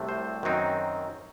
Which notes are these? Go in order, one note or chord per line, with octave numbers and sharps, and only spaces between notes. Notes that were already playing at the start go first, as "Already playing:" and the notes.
Already playing: C2 C3 F#3 A3 C4
C5
F#2 D#3 F#3 C4 D#4